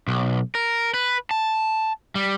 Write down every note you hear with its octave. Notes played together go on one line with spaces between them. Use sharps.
B1
A#4
B4
A5
G3